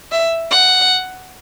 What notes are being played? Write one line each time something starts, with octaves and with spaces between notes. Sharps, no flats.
E5
F#5